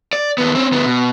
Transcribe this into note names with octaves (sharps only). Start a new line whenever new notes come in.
D5
D#2 B3
C4 C#4
D2 B3
B2